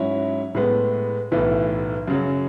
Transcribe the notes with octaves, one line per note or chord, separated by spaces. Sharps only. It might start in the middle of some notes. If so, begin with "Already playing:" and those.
Already playing: G#2 F#3 C#4 E4
A2 G#3 B3
B1 A2 E3 B3
F#2 C#3 F#3